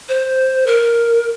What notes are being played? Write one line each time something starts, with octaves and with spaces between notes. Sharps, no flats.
C5
A#4